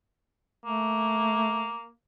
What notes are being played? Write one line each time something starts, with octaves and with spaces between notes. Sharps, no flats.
A3 A#3